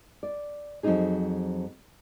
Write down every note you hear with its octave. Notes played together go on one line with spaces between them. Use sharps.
D5
F2 F#3 G#3 C4 D#4 G#4